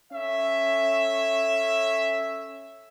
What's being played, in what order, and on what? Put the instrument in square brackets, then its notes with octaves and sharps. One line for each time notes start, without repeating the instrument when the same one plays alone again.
[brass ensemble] C#4 A4 E5